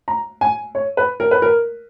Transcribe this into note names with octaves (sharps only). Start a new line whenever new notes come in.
A#5
G#5
C#5
B4
A#4
B4
A#4